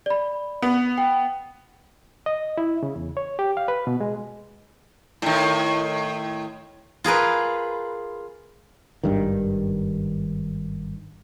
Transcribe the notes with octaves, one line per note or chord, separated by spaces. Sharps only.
D5 B5
B3
G5
D#5
E4
C#3
E2
C#5
G4
F5
B4
B2
G#3
A2 D#3
F4 G#4 A#4 B4
G#1 G2 D#3